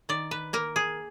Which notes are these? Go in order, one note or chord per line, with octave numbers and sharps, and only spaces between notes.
D#3 D5
B4
A#3 A#4
G#4